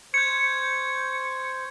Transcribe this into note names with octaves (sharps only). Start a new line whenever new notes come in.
C5 C#6 G6 G#6 C#7